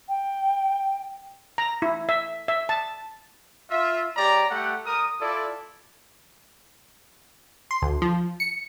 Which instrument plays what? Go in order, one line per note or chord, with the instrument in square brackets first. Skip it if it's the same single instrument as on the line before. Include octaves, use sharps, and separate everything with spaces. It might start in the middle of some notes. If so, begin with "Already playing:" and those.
[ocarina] G5
[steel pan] A#5
E4
E5
E5
A5
[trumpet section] F4 E5
G#3 G4 C#5 D5 A#5
G3 A3 G4 F#5
G3 A#4 D#6
E4 F4 A4 D5
[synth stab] C6
D2
F3
C#7